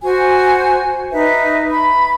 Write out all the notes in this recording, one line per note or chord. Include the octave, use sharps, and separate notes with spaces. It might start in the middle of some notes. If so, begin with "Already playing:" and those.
F#4 C5 G#5
D#4 B4 E5
B5